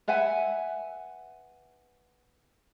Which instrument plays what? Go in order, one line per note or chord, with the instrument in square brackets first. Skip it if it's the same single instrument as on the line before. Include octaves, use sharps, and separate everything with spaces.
[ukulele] B4 E5 F#5 G#5